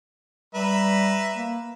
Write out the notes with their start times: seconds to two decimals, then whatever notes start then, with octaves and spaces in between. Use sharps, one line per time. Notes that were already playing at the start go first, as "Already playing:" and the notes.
0.55 G3 B4 E5 A#5
1.34 A#3